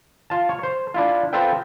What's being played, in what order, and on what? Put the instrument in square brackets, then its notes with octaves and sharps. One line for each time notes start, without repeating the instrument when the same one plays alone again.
[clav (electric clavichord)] F4 A5
C#5
C5
D4 E4 F4
C4 F4 A4 B4 E5 G5